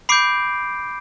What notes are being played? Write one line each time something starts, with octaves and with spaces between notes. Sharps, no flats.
B5 D6 G6 C7 D7